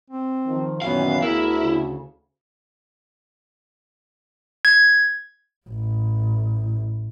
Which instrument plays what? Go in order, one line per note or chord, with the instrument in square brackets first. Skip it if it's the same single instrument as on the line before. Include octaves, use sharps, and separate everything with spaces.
[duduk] C4
[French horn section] D#3 F3
[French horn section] F#2 A#2 D#3 [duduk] E3 [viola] B3 C#4 [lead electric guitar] F5
[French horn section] D2 [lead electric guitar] E4 [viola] G#4 [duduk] A#4
[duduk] C#3
[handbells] G#6
[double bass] A1